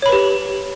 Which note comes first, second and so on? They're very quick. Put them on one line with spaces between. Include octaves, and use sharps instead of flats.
C#5 B5 B4 G4